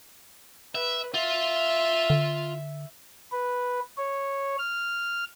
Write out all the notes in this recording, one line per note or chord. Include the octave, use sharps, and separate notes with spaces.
B4 E5
F4 E5
D3
B4
C#5
F6